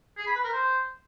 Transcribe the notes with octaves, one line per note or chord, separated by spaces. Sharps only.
G#4
B5
B4
A#4
C5